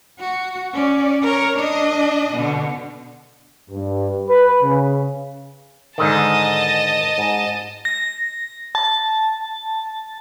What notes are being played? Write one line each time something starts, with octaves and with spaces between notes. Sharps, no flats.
F#4
C#4 D5
A#4 C#5
D4 D#5
B2 D3
G2
B4
C#3
G#2 D3 D#3 D#5 A5
G#2
A#6
A5